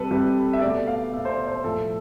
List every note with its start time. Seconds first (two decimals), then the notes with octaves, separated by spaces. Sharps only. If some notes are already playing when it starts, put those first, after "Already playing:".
Already playing: C3 G3 A4 B4
0.11 C3 G3
0.53 E5
0.61 B2 A3 D5
0.87 F5
1.13 B2 A3 E5
1.25 C5
1.30 D5
1.47 C5
1.64 A2 F3 A3 A4